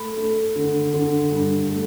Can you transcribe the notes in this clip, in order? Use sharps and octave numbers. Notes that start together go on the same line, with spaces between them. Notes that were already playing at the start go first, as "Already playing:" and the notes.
Already playing: A3 B5
A3
D3
D3
G2
A3